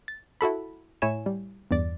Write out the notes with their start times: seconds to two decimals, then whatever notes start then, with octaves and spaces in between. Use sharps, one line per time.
0.08 A6
0.41 E4 F#4 A4 B5
1.02 A2 E4 C#5 G#5 E7
1.26 G3
1.71 E2 G2 D5 A6